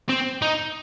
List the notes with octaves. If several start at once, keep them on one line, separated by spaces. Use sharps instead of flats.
C4
D#4